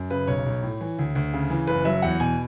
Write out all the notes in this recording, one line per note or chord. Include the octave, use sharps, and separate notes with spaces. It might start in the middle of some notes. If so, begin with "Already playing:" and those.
Already playing: F#2
C#3 B4
B1 C#5
B1
A2
E3
D2
D2
C#3
E3
F#1 B4
F#3 E5
E2 F#5
B2 G#5